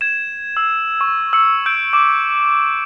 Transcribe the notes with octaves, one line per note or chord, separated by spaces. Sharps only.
G#6 E7
E6
C#6
E6 C#7
E6 G6 D7
D6